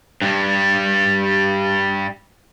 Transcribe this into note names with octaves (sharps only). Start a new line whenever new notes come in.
G2 G3